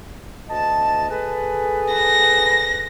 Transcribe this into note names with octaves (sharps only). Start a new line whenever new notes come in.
D2 D#5 A5
G#4 A4 B4
A#6